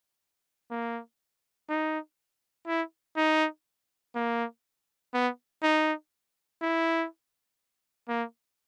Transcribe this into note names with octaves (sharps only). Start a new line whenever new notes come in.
A#3
D#4
E4
D#4
A#3
B3
D#4
E4
A#3